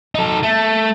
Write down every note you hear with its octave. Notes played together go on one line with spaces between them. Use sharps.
D#4 A4
A3